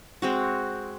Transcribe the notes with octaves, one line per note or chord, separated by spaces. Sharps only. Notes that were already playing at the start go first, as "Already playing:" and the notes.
G#3 C4 F#4